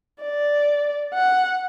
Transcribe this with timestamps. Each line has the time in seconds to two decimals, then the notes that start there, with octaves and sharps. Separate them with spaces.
0.23 D5
1.14 F#5